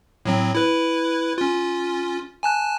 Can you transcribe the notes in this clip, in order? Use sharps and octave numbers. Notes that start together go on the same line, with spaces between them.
A2 F#3 C4
E4 B4
C#4 F4
G#5 A5 F#6